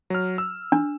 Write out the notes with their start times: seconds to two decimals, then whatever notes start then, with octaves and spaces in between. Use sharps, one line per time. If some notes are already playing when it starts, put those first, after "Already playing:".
0.10 F#3 F6
0.38 E6
0.72 D4